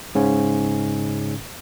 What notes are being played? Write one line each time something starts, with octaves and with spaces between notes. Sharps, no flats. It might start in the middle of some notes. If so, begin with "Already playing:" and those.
G#2 C#3 C#4